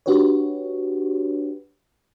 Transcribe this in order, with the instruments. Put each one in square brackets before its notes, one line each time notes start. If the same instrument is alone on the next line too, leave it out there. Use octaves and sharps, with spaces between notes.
[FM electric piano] D4 F#4 G4 B4 C#5